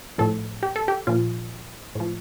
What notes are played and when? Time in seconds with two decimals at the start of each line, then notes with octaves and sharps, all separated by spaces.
0.18 A2 F3 A4
0.63 G4
0.76 A4
0.88 G4
1.07 A#2 F3 F4
1.95 A2 F3